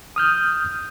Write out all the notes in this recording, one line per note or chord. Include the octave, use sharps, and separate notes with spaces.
D#6 F6 G6